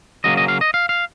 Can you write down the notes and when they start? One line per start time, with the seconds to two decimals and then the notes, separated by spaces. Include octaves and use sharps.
0.24 C#3 F#3 A#3 D#5
0.37 D#5
0.48 F5
0.61 D#5
0.74 F5
0.89 F5